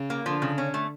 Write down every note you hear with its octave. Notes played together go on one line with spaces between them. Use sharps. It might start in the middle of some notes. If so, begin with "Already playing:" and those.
Already playing: C#3
A#3
D3 F3
C#3
C#4
A3